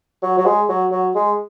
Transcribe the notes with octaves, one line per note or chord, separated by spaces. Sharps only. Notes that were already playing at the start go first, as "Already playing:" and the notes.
F#3
F#3
G#3
F#3
F#3
G#3